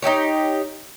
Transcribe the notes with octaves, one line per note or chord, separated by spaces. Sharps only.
D#4 E4 G4 C#5